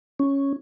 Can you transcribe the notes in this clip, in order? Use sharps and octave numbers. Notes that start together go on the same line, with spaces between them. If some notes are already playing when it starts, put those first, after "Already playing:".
C#4